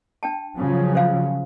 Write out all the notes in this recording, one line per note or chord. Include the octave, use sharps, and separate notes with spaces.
D4 G5 A5
C#3 F3 F#3
C5 F5